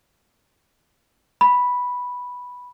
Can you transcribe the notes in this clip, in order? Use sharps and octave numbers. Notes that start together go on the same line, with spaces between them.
B5